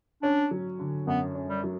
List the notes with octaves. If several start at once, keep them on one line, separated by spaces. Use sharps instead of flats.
C#4 D4
F#3
D3
F#2 B3
C#4
G3
F#3